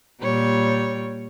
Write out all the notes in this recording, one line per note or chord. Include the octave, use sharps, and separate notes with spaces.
A#2 G3 C#5